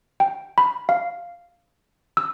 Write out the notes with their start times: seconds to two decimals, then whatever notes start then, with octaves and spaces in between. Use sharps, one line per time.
0.20 G5
0.58 B5
0.89 F5
2.17 E6